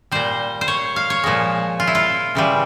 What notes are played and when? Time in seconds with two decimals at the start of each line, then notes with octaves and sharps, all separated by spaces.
0.12 A#2 G3 C5
0.61 C5
0.68 C#5
0.96 F5
1.10 C#5
1.24 A#2 F3 G#3
1.80 F4
1.87 E4
1.95 F4
2.35 C#3 E3 G3